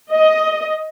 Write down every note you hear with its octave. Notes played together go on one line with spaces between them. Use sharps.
D#5